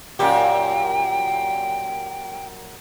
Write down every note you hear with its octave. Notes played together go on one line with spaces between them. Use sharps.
F#2 A#2 G4 G5